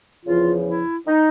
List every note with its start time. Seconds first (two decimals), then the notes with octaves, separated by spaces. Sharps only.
0.25 E2 C#3 F3 F4
0.66 E4
1.07 D#4